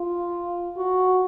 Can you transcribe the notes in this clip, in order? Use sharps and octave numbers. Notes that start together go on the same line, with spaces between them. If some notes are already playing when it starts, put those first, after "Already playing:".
Already playing: F4
F#4